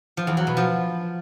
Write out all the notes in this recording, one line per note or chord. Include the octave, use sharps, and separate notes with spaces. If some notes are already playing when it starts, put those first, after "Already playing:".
F3
E2
F#3
B2
F3